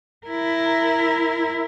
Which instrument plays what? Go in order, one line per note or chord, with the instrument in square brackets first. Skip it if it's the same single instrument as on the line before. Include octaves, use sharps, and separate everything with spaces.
[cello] E4 A#4